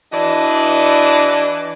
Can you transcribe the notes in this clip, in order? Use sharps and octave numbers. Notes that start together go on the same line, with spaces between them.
E3 D4 E4 F#4 D5 D#5